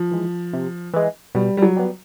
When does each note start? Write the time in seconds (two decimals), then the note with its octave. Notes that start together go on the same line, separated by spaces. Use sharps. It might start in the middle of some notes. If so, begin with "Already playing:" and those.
Already playing: F3
0.11 E3 G#3
0.53 C3
0.93 E3 G#3
1.35 B2 G3
1.57 G3
1.62 F#3
1.77 G3 B3